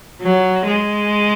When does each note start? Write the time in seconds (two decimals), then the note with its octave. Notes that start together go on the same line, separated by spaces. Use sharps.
0.22 F#3
0.67 G#3